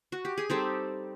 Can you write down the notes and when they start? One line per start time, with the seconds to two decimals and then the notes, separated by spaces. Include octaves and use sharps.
0.12 F#4
0.25 G4
0.38 G#4
0.49 G3 C4 D#4 G4 A4